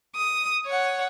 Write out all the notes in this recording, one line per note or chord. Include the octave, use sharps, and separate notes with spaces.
D#6
C#5 F#5